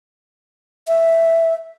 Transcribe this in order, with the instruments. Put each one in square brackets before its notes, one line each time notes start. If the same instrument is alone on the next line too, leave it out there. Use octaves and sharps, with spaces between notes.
[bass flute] E5